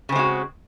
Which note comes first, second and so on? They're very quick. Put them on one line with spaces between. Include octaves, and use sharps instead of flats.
C#3 C4 G#3 F#4